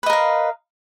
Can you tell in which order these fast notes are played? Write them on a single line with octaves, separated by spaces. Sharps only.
B4 D#5 A#4 F5